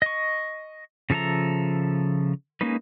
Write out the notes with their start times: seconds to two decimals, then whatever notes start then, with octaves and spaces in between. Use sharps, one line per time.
0.02 D#5 C#6
1.10 C#3 F3 A4 E5 A#5
2.61 G#3 A#3 C#4 D#4 B4